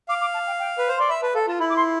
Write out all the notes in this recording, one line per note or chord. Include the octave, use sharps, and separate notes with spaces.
F5 D6
D6
A5
G5
G5
B4
C5
D5 C6
E5 B5
B4 A5
A4 F5
F4 A5
E4 B5
D6
C6